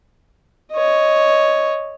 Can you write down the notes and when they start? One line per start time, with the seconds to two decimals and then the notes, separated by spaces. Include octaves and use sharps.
0.72 C#5 D#5